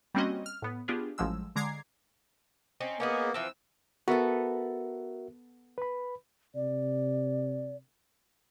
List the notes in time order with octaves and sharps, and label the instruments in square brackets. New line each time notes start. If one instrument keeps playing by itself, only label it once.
[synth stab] G3 A#3 C4 C#4 F#4 D#5
F6
A2 B3
B3 D4 F4 G4 G#4
A1 F3 F#3 G#3 E6
D3 G#3 A#5 D6 G#6 C7
[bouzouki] C4 C#4 D#4
[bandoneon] A#3 B3 [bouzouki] C#4 D#4 G#4
[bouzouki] E3 F3 C4 [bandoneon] E6
[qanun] B3 A4 [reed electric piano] F#4 A#4 E5
[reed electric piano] B4 B5
[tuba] C3 [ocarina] D5